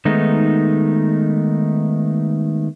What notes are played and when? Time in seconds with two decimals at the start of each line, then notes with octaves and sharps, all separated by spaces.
0.05 D#3 G#3 A3 B3 D#4